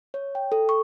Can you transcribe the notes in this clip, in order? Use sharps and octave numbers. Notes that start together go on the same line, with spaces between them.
C#5
G5
A4
C#6